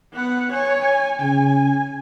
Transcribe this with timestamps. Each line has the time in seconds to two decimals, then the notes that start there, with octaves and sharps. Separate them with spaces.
0.13 B3 F#5
0.52 C#5 G#5
0.81 G#5
1.20 C#3 G#5